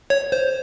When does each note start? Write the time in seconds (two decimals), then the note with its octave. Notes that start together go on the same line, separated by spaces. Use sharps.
0.10 C#5
0.32 C5